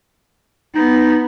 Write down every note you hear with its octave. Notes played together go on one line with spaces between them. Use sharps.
B3 D#4